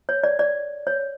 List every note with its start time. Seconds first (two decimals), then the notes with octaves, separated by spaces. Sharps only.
0.09 C#5
0.24 D5
0.39 D5
0.87 C#5